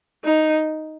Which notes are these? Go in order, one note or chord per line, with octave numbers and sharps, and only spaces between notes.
D#4